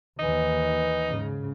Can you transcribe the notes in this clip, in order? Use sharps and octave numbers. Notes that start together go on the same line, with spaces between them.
D#2 E3 D#4
G#2 C#3